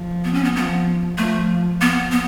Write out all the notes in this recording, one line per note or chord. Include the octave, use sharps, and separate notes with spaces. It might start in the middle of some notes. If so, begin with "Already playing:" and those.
Already playing: F3
B3
C#4
B3
F3 B3
F3 A3
F3 B3
B3